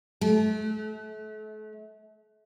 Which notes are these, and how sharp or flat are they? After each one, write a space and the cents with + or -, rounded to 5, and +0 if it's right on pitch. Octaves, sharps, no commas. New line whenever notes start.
A3 -35